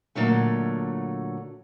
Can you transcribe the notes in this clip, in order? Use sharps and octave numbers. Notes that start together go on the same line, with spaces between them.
A#2 D3 F#3 A3